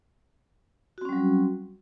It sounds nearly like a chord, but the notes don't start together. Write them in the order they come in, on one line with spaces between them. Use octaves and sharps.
F#4 C4 C#4 G3 F#3